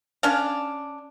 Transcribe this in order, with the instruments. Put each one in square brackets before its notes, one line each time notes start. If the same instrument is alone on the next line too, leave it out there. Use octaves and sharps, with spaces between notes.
[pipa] C#4 D4 F5